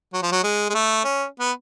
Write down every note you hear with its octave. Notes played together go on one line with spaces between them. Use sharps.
F#3
F3
F#3
G#3
G#3
A3
C#4
B3